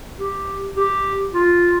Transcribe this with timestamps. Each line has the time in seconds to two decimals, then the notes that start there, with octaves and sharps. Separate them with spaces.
0.20 G4
0.77 G4
1.34 F4